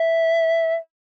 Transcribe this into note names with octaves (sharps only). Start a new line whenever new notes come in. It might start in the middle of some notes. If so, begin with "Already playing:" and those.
Already playing: E5